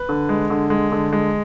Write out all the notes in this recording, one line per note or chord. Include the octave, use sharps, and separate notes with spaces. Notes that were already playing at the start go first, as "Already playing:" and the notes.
Already playing: B4
D3
G#3
D3
G#3
D3
G#3